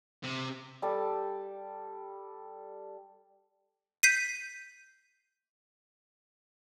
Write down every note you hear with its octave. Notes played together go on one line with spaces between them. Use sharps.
C3
G3 G4 A4 A5
G6 B6 C7 D#7